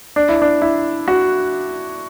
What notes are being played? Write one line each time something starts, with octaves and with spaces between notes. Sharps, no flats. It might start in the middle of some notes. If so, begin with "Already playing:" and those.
D4
E4
D4
E4
F#4